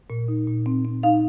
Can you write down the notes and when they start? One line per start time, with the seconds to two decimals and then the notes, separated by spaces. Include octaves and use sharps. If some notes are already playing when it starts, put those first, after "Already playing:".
0.10 A#2
0.28 D#4
0.47 A#2
0.66 C4
0.85 C4
1.03 D#4 F5